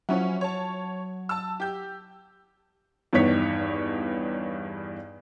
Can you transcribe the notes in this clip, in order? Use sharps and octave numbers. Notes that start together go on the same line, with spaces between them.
F3 F#3 C#4 E4
C#5 A5
A5 E6
G4 G6
E2 G2 D#3 B3 C#5 B6